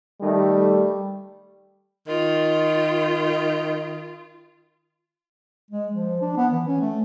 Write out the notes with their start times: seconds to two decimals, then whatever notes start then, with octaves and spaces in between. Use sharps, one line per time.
0.21 D#3 G3 A3
2.07 D#3 F4
5.70 G#3
5.92 F3
6.22 D4
6.37 B3
6.52 E3
6.67 C#4
6.81 A3